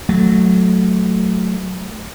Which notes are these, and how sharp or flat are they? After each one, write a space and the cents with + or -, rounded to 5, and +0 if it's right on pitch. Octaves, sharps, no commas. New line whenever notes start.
F#3 -5 A3 -10